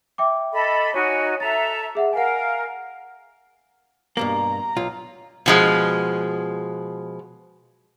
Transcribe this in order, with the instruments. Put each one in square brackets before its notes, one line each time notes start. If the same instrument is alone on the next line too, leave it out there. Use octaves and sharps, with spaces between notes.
[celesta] E5 G5 D6
[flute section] A4 D#5 B5
[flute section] D#4 F#4 G#5 [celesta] C#5 C#6
[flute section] A4 E5 A#5 [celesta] A6
[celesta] G#4 E5 F#5
[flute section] A#4 F5 [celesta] F#5 G#5
[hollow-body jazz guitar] G2 B2 A#3 [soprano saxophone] A#5
[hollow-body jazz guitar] B1 F4
[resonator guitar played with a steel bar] B2 F3 G#3